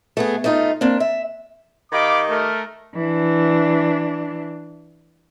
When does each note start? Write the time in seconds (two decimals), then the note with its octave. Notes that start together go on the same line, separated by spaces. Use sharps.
0.17 A3 B3 G#4
0.44 A3 D#4 F4
0.81 A#3 C4 D4
1.00 E5
1.92 D#3 G4 D#5 F5 B5 D6
2.29 A3 A#4
2.94 E3 D4